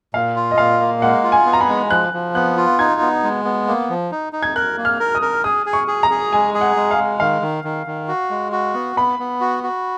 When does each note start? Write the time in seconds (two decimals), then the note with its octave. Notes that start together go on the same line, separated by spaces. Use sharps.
0.14 A#2 F5
0.36 F4
0.51 D#5
0.58 A#2 F5
0.80 A#3
1.02 G#3 F#5
1.24 F4
1.32 G#5
1.46 B3
1.53 A#5
1.61 B5
1.69 G#3
1.91 F3 F#6
2.13 F3
2.35 B3 F#6
2.57 F4
2.79 D#4 G#6
3.01 B3
3.23 G#3
3.45 B3
3.68 A#3
3.90 F3
4.12 D#4
4.33 D#4
4.43 G#6
4.55 A#4 F#6
4.77 A#3
4.85 F6
5.00 A#4
5.15 D#6
5.22 A#4
5.44 G#4 D#6
5.66 G#4
5.73 C#6
5.88 G#4
6.03 A#5
6.10 G#4
6.32 G#3 G#5
6.54 G#4
6.61 F#5
6.76 G#3
6.91 F5
6.98 G#3
7.20 D#3 F5
7.42 D#3
7.64 D#3
7.87 D#3
8.08 F#4
8.30 G#3
8.52 F#4
8.74 B3
8.96 B3 B5
9.19 B3
9.41 F#4
9.64 F#4